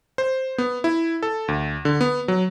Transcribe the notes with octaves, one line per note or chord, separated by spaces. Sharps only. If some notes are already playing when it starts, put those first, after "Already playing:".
C5
B3
E4
A4
D2
D3
B3
F#3